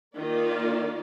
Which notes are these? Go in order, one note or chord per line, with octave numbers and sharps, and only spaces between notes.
D#3 A#3 F4 D5